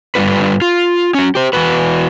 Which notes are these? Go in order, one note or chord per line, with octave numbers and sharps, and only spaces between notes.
G2 D3 G3 D4 F4 B4
F4
F#3 C#4
G4 C5
E2 C#3 E3 F#4 B4